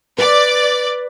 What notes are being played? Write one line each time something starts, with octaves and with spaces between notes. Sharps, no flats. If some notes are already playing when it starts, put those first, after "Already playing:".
B4 D5